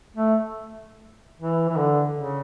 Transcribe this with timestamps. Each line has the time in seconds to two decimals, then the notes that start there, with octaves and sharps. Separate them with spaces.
0.16 A3
1.40 E3
1.69 E3
1.76 D3
2.14 C#3